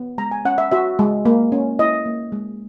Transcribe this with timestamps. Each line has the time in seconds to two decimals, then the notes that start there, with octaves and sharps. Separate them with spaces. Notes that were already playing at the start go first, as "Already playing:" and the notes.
Already playing: B3
0.18 G#3 A#5
0.31 G#5
0.45 C#4 F#5
0.58 E5
0.72 F#4 E5
0.99 G#3
1.25 A#3
1.52 C#4
1.79 E4 D#5
2.06 A#3
2.32 G#3